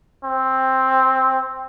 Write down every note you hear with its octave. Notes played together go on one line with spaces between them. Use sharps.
C4